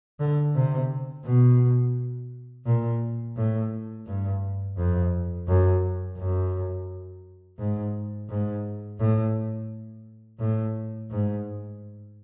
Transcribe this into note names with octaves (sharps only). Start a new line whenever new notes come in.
D3
C3
B2
A#2
A2
G2
F2
F#2
F#2
G#2
G#2
A2
A2
G#2